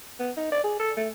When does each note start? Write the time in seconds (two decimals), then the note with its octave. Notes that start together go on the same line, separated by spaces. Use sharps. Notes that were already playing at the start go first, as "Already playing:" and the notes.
0.20 B3
0.37 D#4
0.52 D5
0.64 G#4
0.80 A4
0.97 A3